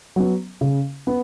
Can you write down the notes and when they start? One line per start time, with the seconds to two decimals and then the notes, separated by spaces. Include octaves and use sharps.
0.16 F#3 B3
0.61 C#3
1.07 B3